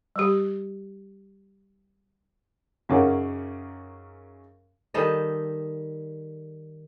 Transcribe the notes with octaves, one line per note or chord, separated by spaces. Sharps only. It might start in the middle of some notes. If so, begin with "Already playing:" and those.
G3 G4
F#2 C#3 C#4 D#4 A#4 D6
D#3 G3 A4 D#5